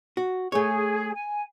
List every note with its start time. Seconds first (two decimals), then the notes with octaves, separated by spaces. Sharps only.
0.17 F#4
0.52 A3 G#4 C#5
1.15 G#5